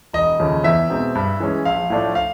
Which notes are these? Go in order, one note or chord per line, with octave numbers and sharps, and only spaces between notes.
E1 D#5
D#2 C#3 F3 A3
E2 E5
B2 G#3 C4 D#4
G2
E3 G#3 C#4
A#1 F5
A2 F3 A3 D4
F5